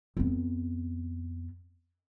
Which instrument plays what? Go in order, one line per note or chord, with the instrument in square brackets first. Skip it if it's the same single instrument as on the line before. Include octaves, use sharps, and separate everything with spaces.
[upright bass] F2 B3